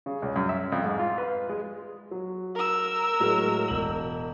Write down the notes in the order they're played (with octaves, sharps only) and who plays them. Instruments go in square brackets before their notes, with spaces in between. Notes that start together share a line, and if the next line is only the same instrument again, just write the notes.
[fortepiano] C#3
C#2
F#2
E5
F2
G#2
F4
B4
G#3
[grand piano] F#3
[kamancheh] A#4 E6
[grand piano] A2 F#3 G#3
E1 F#7